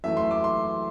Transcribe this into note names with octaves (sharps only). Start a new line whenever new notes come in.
F#2 E3 A3 E5
C6
D6
C6